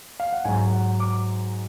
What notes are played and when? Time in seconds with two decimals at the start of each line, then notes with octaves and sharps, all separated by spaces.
0.20 F5
0.33 F#5
0.45 G#2 F#3 G#5
0.72 F#5
1.00 D6